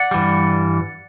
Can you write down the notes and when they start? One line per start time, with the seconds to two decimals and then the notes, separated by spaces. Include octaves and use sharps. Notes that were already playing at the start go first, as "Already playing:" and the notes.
Already playing: D5 F#5
0.11 G2 E3 G3